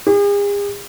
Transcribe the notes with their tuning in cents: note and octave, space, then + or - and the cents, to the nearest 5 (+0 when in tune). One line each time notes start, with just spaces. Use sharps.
G#4 -45